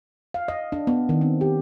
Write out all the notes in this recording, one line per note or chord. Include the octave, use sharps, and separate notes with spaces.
F5
D#5
D4
B3
D#3
C4
G4